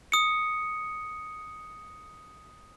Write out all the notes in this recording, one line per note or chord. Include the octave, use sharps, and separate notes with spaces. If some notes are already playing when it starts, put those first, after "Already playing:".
D#6 C#7